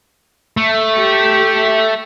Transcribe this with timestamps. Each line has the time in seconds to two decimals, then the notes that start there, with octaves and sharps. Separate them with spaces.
0.57 A3
0.96 G4